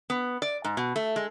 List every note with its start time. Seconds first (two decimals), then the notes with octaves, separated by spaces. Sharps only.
0.10 B3
0.42 D5
0.64 G#2
0.77 B2
0.96 A3
1.16 G#3